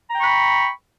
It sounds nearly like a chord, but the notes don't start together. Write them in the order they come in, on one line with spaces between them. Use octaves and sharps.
A#5 G5 C#6 B5